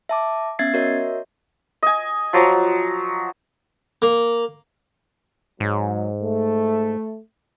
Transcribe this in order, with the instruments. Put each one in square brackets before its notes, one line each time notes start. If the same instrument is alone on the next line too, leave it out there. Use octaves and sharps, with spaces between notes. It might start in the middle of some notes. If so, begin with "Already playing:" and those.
[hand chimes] E5 A5 D6
B3 C#4 E5 G#6 A6 C7
F#4 A#4 C#5 D#5 E5
[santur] D#5 G#5
F3 F#3 A#5
[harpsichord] A#3
[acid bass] G#2 [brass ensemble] F#3 G#3
[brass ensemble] A3